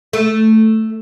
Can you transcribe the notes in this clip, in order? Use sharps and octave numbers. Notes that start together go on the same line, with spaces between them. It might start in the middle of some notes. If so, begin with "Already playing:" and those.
A3